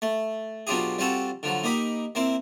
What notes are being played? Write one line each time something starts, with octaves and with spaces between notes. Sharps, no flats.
A3
B2 F#3 D4 F4 G4 G#4
G3 C4 F4 F#4 A4
D3 F3 F#3
A#3 D#4 G4 B5
A#3 C4 E4